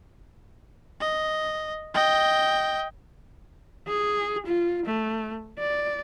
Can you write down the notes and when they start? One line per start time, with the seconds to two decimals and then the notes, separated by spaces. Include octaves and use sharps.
1.00 D#5
1.94 D#5 G5
3.88 G#4
4.47 F4
4.86 A3
5.59 D5